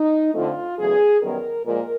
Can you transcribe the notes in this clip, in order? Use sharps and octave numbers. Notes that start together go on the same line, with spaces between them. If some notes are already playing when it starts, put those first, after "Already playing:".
Already playing: D#4
F2 D3 F3 A3 C4 F4
E2 C#3 F#3 A3 G#4
F#2 D#3 G3 B3 A#4
A#2 F3 G#3 A#4